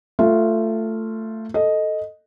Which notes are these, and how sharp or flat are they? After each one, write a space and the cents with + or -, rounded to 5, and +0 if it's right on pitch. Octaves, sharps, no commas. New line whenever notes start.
A3 +15 F4 +0
A4 +0 D#5 +0